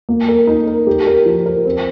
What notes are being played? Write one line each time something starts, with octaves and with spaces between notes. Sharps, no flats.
A#3
A#4
D#4
A#4
G4
A#4
F3
A#4
C4